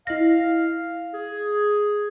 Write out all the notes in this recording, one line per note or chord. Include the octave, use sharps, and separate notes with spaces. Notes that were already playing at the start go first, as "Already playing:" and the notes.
E4 D#5 F5 A#6
G#4